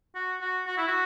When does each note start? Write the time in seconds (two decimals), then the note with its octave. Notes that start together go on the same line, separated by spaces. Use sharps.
0.15 F#4
0.41 F#4
0.66 F#4
0.77 E4
0.87 F#4